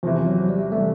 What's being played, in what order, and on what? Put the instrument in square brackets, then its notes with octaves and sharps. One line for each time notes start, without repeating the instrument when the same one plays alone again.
[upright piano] E2 C3 E3 [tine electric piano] F3
[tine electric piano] F#3
G3
[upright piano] C3 E3 [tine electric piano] A3